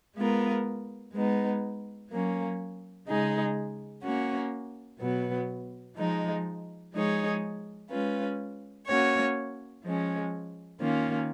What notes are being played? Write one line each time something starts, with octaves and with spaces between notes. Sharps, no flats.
G#3 B3 F4 A#4
G#3 B3 D#4
F#3 A#3 C#4
C#3 G#3 D#4 G#4
A#3 C#4 F#4
B2 F#3 B3
F3 G#3 D#4
F3 G#3 D#4 G#4 C#5
G#3 C#4 F4 B4
A#3 C#4 F#4 C#5
F3 G#3 C#4
D#3 A#3 C#4 F4